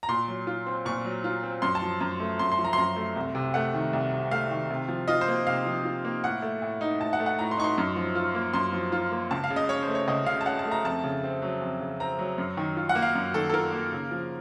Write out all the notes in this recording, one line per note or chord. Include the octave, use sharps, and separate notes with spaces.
A#5
A#2 C6
F#3
F4
C4
A#2 C#6
F#3
F4
C4
F#2 C6
A5
F3
F#2
A3
F#2 C6
C6
F3
A#5
C6
F#2 A#5
A3
C2
C3
A3 F#5
D#3
C2
C3
A3 F5
D#3
C3
F3
F4 D#5
C5
A#3
C3 F5
F3
F4
A#3
A2 F#5
A3
A2
D#4
A2 A5
F#5
A3
F#5
A2 A#5
C6
D#4 C#6
C6
F#2
F3
F4
A#3
F#2 C6
F3
F4
A#3
C#2 A5
F5
C#3
D#5
C#4 C#5
C5
A3
C#5
C#2 D#5
C#3 F5
A5
C#4 F#5
A5
A3
A#5
F2 A5
C#3
C4
F#3
F2
C#3
C4 A#5
F#3
F#2
D#3
F4
F#5
A#3
F5
F#2
D#3 A4
A4
F4 A#4
A#3
C#3
F3